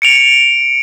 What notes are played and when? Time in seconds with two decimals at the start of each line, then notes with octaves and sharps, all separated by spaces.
0.02 C#7 D7 F7